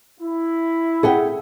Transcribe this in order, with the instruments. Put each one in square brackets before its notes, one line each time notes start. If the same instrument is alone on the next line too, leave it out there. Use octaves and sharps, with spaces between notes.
[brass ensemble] E4
[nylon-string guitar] G#4 F#5 G5